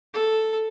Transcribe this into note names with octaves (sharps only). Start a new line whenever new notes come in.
A4